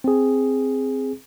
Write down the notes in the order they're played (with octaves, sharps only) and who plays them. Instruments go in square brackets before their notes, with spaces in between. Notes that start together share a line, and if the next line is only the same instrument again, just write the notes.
[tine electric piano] C4 G#4